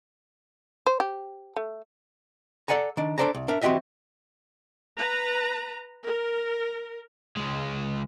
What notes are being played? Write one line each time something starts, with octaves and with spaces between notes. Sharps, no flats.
C5
G4
A3
A4 D5 F#5 G#5 A#5
D#3 D4
D4 A4 C5 D5 A5 A#5
C2
D4 A#4 E5
E3 C4 F#4 G4 D#5 E5
B4 A#5
A#4
C#2 G#3